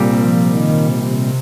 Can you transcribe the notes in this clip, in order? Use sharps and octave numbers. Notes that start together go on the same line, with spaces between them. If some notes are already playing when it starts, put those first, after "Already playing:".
Already playing: C2 A#2 G3 C4
F3
D#3
C3